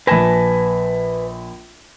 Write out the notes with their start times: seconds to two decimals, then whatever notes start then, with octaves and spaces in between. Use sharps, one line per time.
0.07 A#1 B4 G#5 A5 B5 A#6